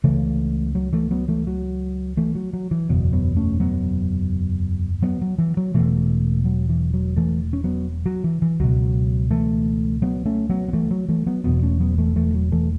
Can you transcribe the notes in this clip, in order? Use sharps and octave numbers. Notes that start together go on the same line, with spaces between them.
C#2 C#3 E3 A3
F#3
E3 A3
F#3 B3
E3 A3
F#3
E3 A3
F#3
F#3
E3
F#1 E2 B2 F#3
F#3 B3
A3 C#4
F#3 B3
F#3 B3
F#3
E3
F#3
E2 B2 E3 A3
E1
F#3
E3
F#3
E3 A3
C#4
F#3 B3
F#3
E3
E3
C#2 B2 F#3
E3 A3
F#3 B3
A3 C#4
F#3 B3
B3
E3 A3
F#3
E3 A3
F#3 B3
E1 E2 B2 F#3 B3
A3 C#4
F#3 B3
E3 A3
E3 A3
F#3
E3 A3